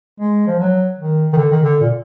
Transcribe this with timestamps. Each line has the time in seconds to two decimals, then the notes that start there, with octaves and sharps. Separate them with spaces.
0.20 G#3
0.47 F3
0.59 F#3
0.99 D#3
1.33 D#3
1.38 D3
1.52 D#3
1.63 D3
1.81 A#2